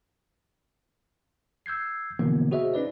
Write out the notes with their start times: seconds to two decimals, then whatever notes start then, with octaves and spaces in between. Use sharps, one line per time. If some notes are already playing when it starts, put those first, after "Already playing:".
1.66 E6 G6 G#6 C7
2.19 B2 D3 E3 F3 A#3 B3
2.51 F#4 G#4 C5 D#5 E5
2.74 C#4 D#4 B4 D5